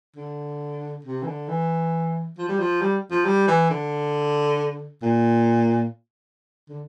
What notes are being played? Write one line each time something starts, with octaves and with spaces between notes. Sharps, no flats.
D3
C3
E3
D3
E3
F3
G3
F3
G3
F3
G3
E3
D3
A#2
D3